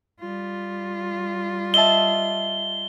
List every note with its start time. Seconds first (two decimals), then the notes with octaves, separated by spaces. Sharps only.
0.20 G3 F4
1.74 D#5 E5 A5 G7